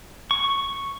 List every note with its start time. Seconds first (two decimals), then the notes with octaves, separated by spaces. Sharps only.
0.31 C#6